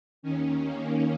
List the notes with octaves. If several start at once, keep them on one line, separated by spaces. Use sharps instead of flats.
D#2 D#3 C#4
A#3